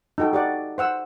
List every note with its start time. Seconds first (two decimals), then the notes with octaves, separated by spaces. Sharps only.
0.18 D#4 F#4 A4 G5
0.33 G4 D5 F#5
0.78 C5 F#5 E6